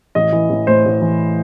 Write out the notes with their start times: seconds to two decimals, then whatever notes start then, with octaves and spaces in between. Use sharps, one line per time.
0.15 A1 D#5
0.32 E3
0.50 A1
0.67 A2 C5
0.85 A1
1.02 E3